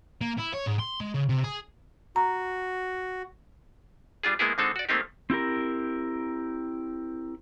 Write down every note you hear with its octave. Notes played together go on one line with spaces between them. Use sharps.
A#3
E4
C#5
G#2
C6
G#3
C#3
C3
G#4
F#4 A#5
G3 D4 F4 G#4
G#3 A#3 B3 E4 G#4
D3 G#3 C4 D#4 A4
F#4 D5
A3 A#3 C4 D#4 G4
C4 E4 G4 A#4